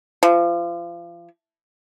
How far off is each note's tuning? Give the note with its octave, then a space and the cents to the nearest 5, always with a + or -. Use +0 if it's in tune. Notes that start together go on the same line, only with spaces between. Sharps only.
F3 -30